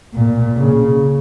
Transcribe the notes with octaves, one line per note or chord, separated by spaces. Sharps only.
A#2
C#3